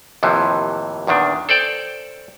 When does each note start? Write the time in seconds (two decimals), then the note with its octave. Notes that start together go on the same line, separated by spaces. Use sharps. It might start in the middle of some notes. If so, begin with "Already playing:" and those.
0.23 D#2 A2 C3 E3 F3
1.07 E2 A#2 D#3 D4
1.49 A4 C5 D5 G5